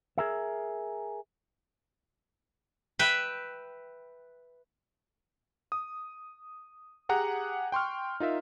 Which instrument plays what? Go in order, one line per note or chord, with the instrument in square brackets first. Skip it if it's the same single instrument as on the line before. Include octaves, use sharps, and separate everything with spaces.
[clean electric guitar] G#4 A#4 E5
[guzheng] B4 E5 G5
[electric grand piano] D#6
G4 G#4 F#5 A#5 F#6
G5 C6 C#6 F6
D#4 F4 A#4 E5